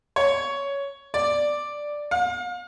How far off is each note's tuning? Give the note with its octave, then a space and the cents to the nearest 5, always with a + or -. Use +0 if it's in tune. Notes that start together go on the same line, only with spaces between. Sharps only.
C#5 +10
D5 +5
F5 +40